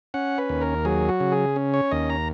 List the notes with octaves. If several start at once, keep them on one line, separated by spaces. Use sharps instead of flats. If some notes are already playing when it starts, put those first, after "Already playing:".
C#4 F#5
B4
D#2
A#4
F#3 G#4
F#4
C#3
G#4
C#4
C#5
D#2 D#5
A#5